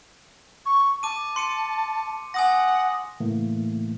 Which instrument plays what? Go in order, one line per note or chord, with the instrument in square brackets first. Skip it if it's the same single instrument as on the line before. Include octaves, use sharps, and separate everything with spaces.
[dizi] C#6
[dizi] A5 [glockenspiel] D6 D#7
[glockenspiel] C6 C#7 D#7
[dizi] F#5 [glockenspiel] G#5 D#6 A#6
[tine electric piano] A2 C#3 E3 A3 A#3